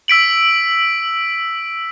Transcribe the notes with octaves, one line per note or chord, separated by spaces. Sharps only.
E6 B6 D7 F#7